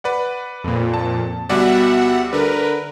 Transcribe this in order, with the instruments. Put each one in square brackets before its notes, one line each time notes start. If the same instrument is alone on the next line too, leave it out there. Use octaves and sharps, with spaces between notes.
[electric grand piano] B4 D5 F#5
[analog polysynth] F2 A#2
[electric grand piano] A5
[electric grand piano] D2 G3 D5 [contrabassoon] B2 [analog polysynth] E5 F#5
[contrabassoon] D3 [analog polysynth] A#4 B4